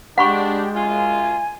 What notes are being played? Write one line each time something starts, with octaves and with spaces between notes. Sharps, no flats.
G#3 D4 G4 F#5 B5 C#6
F#2 F4 G#5